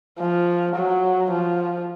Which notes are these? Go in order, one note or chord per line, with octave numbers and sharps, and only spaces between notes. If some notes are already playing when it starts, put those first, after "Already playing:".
F3
F#3
F3